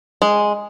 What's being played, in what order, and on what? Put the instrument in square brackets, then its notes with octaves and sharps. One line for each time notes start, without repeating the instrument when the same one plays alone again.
[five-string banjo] G#3